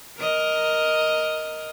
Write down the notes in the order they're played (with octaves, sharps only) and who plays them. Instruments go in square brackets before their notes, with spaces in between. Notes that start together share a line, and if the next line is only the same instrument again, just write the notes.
[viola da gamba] A#4 D#5